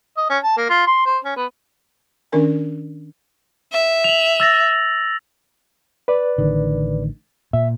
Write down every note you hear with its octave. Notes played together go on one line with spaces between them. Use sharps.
D#5
C#4
A5
A#3
F4
C6
C5
C#4
B3
D#3 C#4 D4 A#4 G#5
E5
F7 F#7
E6 A6 A#6
B4 D5
A1 D3 D#3
A#2 E5